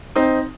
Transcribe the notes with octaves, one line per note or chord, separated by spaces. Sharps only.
C4 D#4